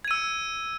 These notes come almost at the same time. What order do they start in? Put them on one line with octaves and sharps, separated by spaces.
G#6 D#7 E6